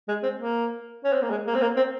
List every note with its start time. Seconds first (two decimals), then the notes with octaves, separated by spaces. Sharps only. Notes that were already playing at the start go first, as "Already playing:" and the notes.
0.08 G#3
0.23 C4
0.38 A#3
1.04 C#4
1.13 C4
1.22 A#3
1.31 G#3
1.47 A#3
1.55 C4
1.61 A#3
1.77 C4